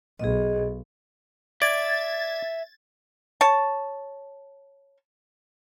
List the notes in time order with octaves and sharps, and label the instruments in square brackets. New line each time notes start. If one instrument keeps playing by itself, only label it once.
[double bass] B1 [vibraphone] G#4 D#5
[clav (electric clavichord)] D5 [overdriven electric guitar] E5 [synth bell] G#6 A6
[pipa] C#5 A5